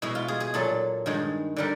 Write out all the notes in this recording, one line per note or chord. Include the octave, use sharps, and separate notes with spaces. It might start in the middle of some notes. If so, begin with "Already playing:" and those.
B2 G#3 E4
F4
G#4
G#4
A#2 F#3 A4
G2 D#3 G#3
D3 G3 A#4